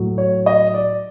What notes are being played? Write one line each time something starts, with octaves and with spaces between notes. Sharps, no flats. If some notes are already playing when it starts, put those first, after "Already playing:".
Already playing: A2 F#3
C#5
D#5
D5